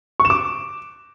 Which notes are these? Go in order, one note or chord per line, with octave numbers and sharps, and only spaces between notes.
C#6
E7
D6